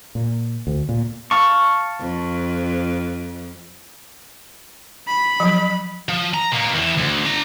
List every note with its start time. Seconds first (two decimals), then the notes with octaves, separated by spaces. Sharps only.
0.15 A#2
0.67 D2
0.89 A#2
1.31 F5 A5 C#6
2.00 F2
5.08 B5
5.40 F3 F#3
6.09 F3
6.34 A#5
6.52 B2 A#3
6.75 E2 E3
6.98 D2
7.25 D4 A#5